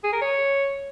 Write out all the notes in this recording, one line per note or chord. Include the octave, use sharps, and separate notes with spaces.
G#4
A#4
C#5